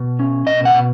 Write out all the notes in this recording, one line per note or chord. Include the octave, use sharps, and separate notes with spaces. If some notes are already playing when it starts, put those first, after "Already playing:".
Already playing: B2
C#4
B2 D#5
F#5
B2